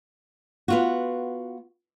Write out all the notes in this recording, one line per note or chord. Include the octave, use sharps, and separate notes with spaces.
B3 F4 F#4